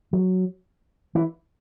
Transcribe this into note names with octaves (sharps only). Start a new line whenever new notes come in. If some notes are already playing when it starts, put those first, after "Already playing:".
F#3
E3